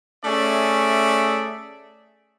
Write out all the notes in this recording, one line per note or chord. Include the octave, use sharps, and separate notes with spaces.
A3 C#4 G#4 D5 E5